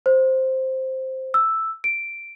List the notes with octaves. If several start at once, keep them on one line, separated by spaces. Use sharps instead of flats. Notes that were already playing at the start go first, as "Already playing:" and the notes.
C5
E6
D7